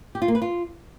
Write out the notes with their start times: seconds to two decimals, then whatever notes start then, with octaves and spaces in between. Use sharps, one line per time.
0.15 G4
0.22 F4
0.28 A#3
0.35 B4
0.42 F4